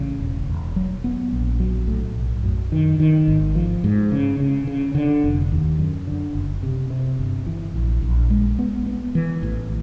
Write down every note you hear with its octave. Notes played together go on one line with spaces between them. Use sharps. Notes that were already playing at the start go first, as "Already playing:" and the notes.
Already playing: A1 C#3
E1
E1
F#3
B3
A#1
F#3
A2
B1
F#2
D#3
D#3
G#1
F3
G#2
C#3
C#3
C#3
D3
F1
D#2
F#2
D3
F#1
C3
C3
G1
E3
A#1
A#1
G#3
B3
B3
E3
A1